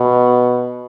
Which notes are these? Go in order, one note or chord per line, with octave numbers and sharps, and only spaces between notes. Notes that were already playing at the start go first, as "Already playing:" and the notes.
Already playing: B2